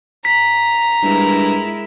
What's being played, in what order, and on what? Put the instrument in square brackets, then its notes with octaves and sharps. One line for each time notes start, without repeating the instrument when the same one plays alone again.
[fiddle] A#5 [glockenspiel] B6
[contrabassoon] G2 [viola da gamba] G#3 E4 A#4